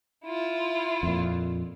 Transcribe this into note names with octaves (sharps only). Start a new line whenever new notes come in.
E4 F4
F2 A#2